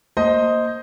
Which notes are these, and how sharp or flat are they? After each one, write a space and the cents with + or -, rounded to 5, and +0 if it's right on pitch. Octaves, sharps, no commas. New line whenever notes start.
A#3 +0 C5 +0 D#5 +5